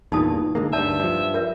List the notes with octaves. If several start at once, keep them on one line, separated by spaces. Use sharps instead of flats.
E2 G2 A#2 D#4 A5 D#6
D3 G#3 A#3
D2 G2 D5 E5 A5
G2 F3
A#4 D5 E5